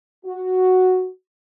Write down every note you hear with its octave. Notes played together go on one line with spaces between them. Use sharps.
F#4